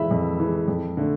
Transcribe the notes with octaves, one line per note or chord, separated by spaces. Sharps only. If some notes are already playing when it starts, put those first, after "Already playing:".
Already playing: F2 E3 G#3 E5 B5
F2
E3 G#3
F2
D3 A3